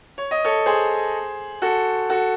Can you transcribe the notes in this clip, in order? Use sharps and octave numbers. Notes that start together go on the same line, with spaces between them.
C#5
D#5
A4 C#5
G#4 C5
F#4 A4
F#4 A4